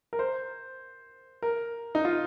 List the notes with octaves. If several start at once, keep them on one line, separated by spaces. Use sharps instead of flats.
A#4
C5
A#4
D#4
F4